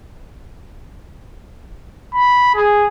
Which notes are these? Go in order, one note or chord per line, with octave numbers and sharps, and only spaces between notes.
B5
G#4